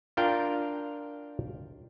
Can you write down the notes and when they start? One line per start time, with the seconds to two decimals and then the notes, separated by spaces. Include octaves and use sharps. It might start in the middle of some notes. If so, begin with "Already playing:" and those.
0.17 D4 F4 A#4 F5 G5